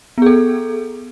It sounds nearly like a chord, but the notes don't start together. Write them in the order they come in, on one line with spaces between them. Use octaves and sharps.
B3 G#4 A4